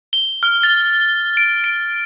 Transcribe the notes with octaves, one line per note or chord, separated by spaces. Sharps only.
G7
F6
A6
D7
D7